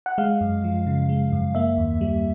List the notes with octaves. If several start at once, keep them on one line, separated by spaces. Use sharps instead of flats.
F#5
G#3 F5
F#2
F3
C#3
G#3
F#2
A#3 E5
D#2
G3